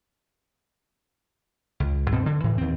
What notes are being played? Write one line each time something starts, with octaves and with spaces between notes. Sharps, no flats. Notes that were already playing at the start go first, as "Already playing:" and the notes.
C#2
G2 B2 C4
D3
D2 A2 E3
D#2 C4